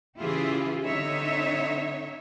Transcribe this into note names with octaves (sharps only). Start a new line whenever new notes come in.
C#3 E3 E4 F4 G4 G#4
D3 C4 D#4 C#5 E5